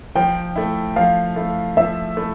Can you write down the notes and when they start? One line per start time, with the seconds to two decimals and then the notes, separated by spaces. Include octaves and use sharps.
0.15 F3 G5
0.56 A3 E4
0.96 F3 F5
1.36 A3 E4
1.77 F3 E5
2.17 A3 E4